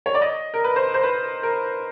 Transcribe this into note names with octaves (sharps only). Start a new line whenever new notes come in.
C#5
D5
D#5
A#4
B4
C5
C5
B4
A#4